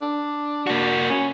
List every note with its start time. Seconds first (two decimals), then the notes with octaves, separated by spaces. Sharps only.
0.02 D4
0.67 A#3 F#4
1.10 C#4